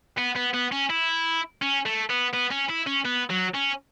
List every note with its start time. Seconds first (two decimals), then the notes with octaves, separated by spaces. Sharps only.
0.18 B3
0.36 B3
0.54 B3
0.72 C#4
0.90 E4
1.62 C#4
1.86 A3
2.10 B3
2.34 B3
2.51 C#4
2.70 E4
2.87 C#4
3.05 B3
3.30 F#3
3.54 C#4